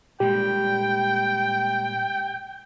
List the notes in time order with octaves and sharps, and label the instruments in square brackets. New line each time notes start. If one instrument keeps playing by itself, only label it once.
[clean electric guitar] A#2 G3 G#3 [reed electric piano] G4 [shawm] G5